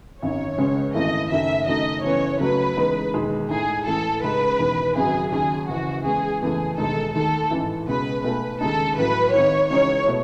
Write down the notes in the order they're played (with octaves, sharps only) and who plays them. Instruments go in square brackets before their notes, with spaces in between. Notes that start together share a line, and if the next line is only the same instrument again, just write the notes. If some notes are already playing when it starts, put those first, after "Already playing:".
[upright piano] G#1 F#2 D#3 [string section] C#5
[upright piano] C#2 C#3 G#3 C#4
[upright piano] G#1 F#2 E3 A3 E4 [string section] D#5
[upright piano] F#1 F#2 D#3 A3 [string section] E5
[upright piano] F#1 F#2 D#3 A3 D#4 [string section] D#5
[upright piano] F#1 F#2 E3 B3 [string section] C#5
[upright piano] C#2 C#3 F#3 A3 [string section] B4
[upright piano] E2 C#3 G#3 D#4
E1 D#2 D#3 G#3
[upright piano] A2 G#3 D#4 [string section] G#4
[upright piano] A1 A2 E3 A3 [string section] A4
[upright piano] C#2 C#3 G#3 D#4 [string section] B4
[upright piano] E1 E2 D#3
[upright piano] G#1 F#2 C#3 F#3 [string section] G#4
[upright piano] D#2 C#3 F#3 C#4 [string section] G#4
[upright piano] F#1 F#2 C#3 E3 [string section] F#4
[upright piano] E2 C#3 G#3 [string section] G#4
[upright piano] F#1 E2 C#3 E3 A3 [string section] G#4
[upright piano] E1 D#2 D#3 G#3 D#4 [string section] A4
[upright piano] D#2 D#3 A3 [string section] A4
[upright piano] A1 G#2 E3
[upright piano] C#2 B2 G#3 C#4 [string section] B4
[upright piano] B1 B2 A3 [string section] B4
[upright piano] D#2 C#3 G#3 D#4 [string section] A4
[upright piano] A1 A2 F#3 [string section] B4
[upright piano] G#1 G#2 D#3 [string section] C#5
[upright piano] C#2 C#3 E3 G#3 D#4 [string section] C#5
[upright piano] B2 A3 E4